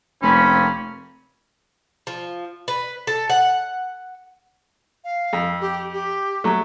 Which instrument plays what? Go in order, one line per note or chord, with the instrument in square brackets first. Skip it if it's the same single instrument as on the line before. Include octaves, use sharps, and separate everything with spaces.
[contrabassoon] F1 [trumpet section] A#3 C4 B5 [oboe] C#4
[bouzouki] F3
B4
A4
F#5
[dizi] F5
[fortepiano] F2
[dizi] G4
G4
[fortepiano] F#3 A3